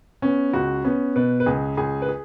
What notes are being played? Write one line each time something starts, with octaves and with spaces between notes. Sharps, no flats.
B3 C#4
C#2 F#4
B3 C#4
B2 B4
B4
C#2 G#4
C#2 G#4
B4
G#4